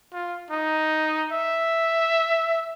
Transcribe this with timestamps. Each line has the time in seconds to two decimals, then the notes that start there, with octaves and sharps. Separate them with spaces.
0.13 F4
0.51 D#4
1.32 E5